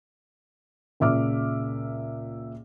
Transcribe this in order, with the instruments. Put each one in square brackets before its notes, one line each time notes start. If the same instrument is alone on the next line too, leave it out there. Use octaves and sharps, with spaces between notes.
[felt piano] C#2 A#2 E5 D6 F6